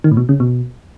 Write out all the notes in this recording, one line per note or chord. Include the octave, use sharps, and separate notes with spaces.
D#3
A2
B2
C#3
B2